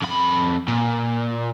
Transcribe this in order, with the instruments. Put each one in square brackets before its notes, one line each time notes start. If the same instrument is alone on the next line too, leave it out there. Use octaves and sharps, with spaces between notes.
[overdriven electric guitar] F2 B5
A#2